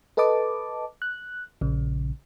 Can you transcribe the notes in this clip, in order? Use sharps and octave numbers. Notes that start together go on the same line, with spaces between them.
A4 B4 D#5 A5 D6
F#6
A#1 C#3